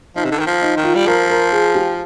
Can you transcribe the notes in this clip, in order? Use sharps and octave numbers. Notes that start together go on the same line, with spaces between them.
F3 D#4
C3
D3
D#3
F3
D#4
D#3
F4
G3
F3 A#4
A#4
G#4
G4